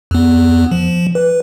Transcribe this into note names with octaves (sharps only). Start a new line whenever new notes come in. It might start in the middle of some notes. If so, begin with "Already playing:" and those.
F2 B3
F3
B4